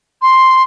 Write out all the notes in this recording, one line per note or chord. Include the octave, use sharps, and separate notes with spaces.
C6